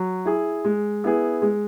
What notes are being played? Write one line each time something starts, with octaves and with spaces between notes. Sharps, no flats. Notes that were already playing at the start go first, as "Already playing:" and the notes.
Already playing: F#3
E4 G#4
G#3
B3 E4 G#4
G#3